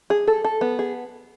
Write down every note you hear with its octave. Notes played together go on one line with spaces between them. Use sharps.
G#4
A4
A4
B3
G#4